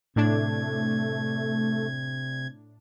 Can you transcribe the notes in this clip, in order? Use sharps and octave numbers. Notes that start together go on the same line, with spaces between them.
A2 C3 A3 D4 G#6